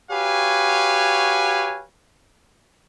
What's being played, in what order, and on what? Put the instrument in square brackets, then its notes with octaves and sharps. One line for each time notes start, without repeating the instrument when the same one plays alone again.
[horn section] F#4 G4 B4 C#5 F5 G#5